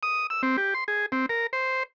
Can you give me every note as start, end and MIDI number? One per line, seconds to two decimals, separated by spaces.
0.03 0.27 87
0.30 0.42 88
0.43 0.57 60
0.57 0.74 67
0.74 0.84 84
0.88 1.06 68
1.12 1.26 60
1.29 1.47 70
1.53 1.83 72